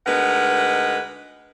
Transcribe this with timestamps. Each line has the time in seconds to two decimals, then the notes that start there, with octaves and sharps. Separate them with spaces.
0.06 D2 G#3 D#4 A#4 B4 F#5